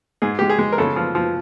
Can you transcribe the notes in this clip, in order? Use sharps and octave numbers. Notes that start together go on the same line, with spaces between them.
G#2 G#4
G#3 G4
G#4
G#3
A#4
C#3 A4
F3
F3